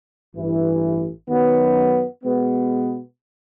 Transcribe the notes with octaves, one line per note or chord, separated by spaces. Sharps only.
A1 G2 E3
F#2 D#3 F#3 B3
B2 G#3 B3